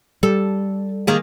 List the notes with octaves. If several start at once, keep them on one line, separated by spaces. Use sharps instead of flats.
G3 A4
D#3 A#3 G#4